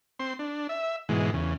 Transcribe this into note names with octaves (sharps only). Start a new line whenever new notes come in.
C4 C6
D4
E5
G#2 B2 E3 G#3
E2 C#3